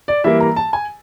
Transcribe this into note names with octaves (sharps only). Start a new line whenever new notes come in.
D5
E3 G3 A#3 E5
A#5
A5
G#5